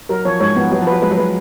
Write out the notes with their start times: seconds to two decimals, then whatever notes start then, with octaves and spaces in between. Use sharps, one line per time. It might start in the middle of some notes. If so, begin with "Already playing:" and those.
0.09 F#3 A#4
0.25 F3 C#5
0.40 G#2 G#3 C#5
0.56 F3 B3
0.71 F#3 B3
0.82 F3
0.87 F#3 B4
1.02 G#3 B4
1.11 F#3
1.18 G#3 B4